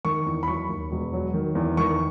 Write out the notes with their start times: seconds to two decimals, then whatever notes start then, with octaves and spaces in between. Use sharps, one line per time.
0.05 D#3 C#6
0.26 E2
0.43 B5
0.48 F#3 C#6
0.69 D#2
0.91 E1
1.13 F#3
1.34 D#3
1.55 E2
1.77 D#3 C#6